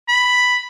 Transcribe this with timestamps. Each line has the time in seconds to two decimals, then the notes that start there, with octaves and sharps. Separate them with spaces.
0.08 B5